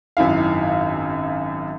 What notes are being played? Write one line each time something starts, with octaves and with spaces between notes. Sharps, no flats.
G#1 F#2 E4 F5